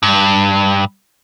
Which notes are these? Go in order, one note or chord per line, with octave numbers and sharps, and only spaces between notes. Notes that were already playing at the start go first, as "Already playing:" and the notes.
G2